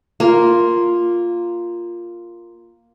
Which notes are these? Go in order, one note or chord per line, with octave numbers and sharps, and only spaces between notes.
A#3 F4